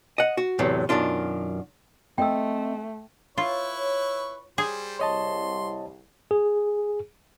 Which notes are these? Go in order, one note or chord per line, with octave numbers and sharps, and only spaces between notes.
D#5 F#5
F#4
E2 A2 C3 F#3 B3
F#2 B2 D#3 D4 F4
A3 C4 D#5 G5 E6
E4 F4 B4 C#5 C#6
G3 G#4 C5
C2 C#5 D#5 A5 C6
G#4